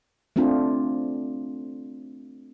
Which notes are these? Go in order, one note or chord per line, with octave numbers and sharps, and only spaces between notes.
A3 C4 D4 F4